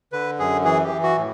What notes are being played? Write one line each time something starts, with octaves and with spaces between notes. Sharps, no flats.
D3 B4
F#2 G#4
E3 G#4
G4
E3
F#4
A2